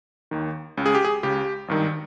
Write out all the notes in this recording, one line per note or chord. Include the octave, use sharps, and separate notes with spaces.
D#2 D#3
C#2 C#3
G#4
G4
G#4
C#2 C#3 G4
G#1 G2 D#3